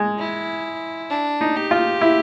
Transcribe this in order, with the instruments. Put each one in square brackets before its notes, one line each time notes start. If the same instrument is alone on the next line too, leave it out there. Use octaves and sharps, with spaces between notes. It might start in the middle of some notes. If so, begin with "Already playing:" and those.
Already playing: [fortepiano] G#3
[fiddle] E4
D4
[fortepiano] D#4
[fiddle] G4
[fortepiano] F4
E4